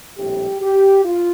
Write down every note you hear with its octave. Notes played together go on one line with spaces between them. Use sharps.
A#1 A2 G3 C4 G4
G4
F4